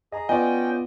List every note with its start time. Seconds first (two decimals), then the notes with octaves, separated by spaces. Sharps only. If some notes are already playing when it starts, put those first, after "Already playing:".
0.12 G#4 D#5 G#5 A#5
0.29 B3 C#4 F4 D5 D#5 G5 G#5